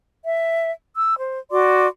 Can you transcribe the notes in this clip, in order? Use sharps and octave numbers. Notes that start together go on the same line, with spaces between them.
E5
E6
C5
F#4 D5 C6 D6